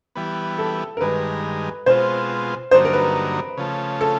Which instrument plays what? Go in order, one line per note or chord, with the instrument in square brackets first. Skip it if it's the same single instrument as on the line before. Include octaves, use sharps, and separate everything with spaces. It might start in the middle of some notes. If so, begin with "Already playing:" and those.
[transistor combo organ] E3 G3 B3
[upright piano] A4
A#4
[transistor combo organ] G2 D#3 G#3 [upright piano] B4
[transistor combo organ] B2 G#3 C4 F4 [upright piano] C5
[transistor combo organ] G2 D3 F#3 A#3 D#4 [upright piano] C5
[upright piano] A#4
B4
[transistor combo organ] C#3 F3 A3
[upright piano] A4